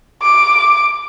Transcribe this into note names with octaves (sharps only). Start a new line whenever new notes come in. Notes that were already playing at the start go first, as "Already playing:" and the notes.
D6